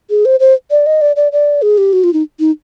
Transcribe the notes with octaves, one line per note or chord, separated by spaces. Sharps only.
G#4
C5
C5
D5
D#5
D5
D5
D5
G#4
G4
F#4
F4
D#4
D#4